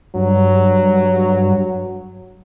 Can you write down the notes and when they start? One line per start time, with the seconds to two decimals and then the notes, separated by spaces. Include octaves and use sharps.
0.15 G2 F#3